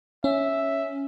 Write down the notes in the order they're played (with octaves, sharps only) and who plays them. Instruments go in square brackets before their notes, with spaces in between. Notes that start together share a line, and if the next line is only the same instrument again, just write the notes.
[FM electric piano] C#4 [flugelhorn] E5